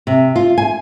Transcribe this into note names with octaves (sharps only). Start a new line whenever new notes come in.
C3
F4
G#5